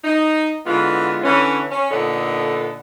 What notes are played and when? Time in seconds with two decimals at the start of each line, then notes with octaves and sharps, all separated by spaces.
0.04 D#4
0.66 D3 E3 G#3 B3 F4
1.24 D3 E3 C#4
1.70 C#4
1.91 A#2 D3 B3 D#4 A4